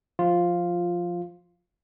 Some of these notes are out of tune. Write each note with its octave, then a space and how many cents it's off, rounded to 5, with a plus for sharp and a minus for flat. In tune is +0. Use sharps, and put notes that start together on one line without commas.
F3 +10 F4 +0